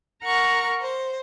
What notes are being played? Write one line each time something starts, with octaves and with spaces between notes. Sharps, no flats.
A#4 F#5 A#5 C#6 F6
C5